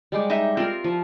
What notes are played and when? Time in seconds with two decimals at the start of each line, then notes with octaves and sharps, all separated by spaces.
0.12 G3 G#3 G4
0.30 D#4 E5
0.57 C4 F4 A#4
0.84 F3